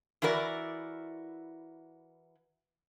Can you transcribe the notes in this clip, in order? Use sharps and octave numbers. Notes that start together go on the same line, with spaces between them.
E3 E4 F#4 A#4 D5